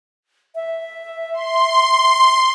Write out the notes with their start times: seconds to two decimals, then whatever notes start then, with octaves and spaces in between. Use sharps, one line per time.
0.55 E5
1.33 C6